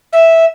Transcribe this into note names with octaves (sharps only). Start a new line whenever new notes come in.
E5